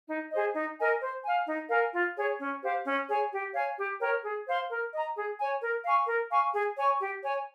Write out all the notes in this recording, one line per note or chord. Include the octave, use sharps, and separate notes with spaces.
D#4
G#4 C5 D#5
D#4
A#4 D#5 G#5
C5
F5 G#5
D#4
A#4 F5 G#5
F4
G#4 C#5
C#4
G4 C5 F5
C#4
G#4 C#5 G#5
G4
C#5 F5 G#5
G4
A#4 C#5 G5
G#4
C5 F5 C6
A#4
D#5 A#5
G#4
C#5 G#5
A#4
F5 G#5 C#6
A#4
F5 G#5 C#6
G#4
C#5 G#5 C#6
G4
C#5 G#5